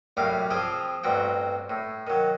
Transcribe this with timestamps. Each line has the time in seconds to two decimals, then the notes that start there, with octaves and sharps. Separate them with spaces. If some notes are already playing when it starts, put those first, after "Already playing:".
0.17 F#2 A2 G3 F5 D6
0.50 F3 C4 G#4 F5 G5
1.03 A1 G2 C4 F#4 G5
1.70 A2
2.07 D#3 F#3